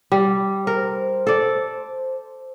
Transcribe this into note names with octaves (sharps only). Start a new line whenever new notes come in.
G3
A#4 C5
A4 D5